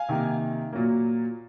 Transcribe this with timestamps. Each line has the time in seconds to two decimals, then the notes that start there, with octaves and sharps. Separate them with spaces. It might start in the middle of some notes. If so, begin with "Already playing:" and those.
Already playing: F5 G#5
0.09 C3 D#3 A#3
0.72 A#2 F#3 A#3